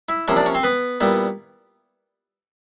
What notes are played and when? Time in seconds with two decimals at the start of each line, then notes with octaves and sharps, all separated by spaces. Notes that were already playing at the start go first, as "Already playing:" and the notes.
0.09 E4 E5
0.28 C3 F3 A#3 C#4 E4 E5
0.36 D4 D5
0.46 C#4 C#5
0.55 C4 C5
0.63 B3 B4
1.00 A#2 G3 B3 E4